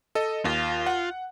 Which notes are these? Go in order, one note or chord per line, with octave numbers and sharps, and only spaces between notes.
A4 D#5
D#2 F4
F#5